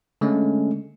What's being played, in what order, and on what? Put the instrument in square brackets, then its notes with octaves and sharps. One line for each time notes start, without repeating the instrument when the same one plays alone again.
[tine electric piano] D3 G#3 A3 C#4